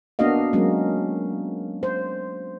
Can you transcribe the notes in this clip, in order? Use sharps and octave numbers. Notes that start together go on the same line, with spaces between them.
A#3 B3 D4 F#4 D#5 F5
F#3 G#3 A#3 C#4
C5